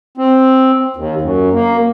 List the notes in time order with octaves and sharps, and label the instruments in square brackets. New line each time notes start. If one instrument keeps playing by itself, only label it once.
[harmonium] C4
D#2
F#2
A#3